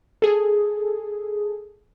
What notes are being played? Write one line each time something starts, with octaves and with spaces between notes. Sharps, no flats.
G#4 A4